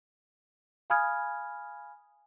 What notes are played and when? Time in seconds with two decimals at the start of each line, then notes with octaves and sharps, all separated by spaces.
0.90 F5 G#5 B5 D#6 F6 G#6